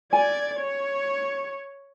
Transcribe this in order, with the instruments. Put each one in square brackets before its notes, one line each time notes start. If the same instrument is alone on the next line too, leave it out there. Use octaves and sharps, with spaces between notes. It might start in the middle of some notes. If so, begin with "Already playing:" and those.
[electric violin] D5 G#6 [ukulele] G#5
[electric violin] C#5